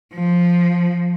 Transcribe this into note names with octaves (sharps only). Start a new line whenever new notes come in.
F3